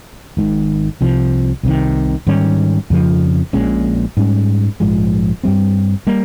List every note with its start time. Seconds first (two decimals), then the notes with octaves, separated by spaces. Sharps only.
0.37 G#1 G#2 D#3
1.01 C2 C3 F3
1.63 C2 C3 D#3
2.27 G#2 D#3 G3 C#4
2.90 F2 C#3 F3
3.53 A#1 A#2 G#3 C#4
4.17 G#2 G3 C#4
4.80 A#1 G#2 F3 G#3
5.44 G2 G3 C4
6.07 G3 A#3